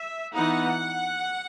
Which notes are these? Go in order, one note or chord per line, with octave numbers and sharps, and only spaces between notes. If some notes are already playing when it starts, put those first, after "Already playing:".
Already playing: E5
E3 B3 D#4 F#5